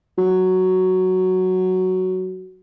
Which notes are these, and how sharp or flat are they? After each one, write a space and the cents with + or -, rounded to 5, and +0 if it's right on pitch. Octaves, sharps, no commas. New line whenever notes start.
F#3 +5